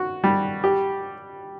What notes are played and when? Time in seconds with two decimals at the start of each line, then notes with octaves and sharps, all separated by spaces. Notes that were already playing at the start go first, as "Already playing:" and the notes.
Already playing: F#4
0.24 G3
0.64 G4